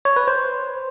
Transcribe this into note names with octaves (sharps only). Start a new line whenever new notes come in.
C#5
B4
C5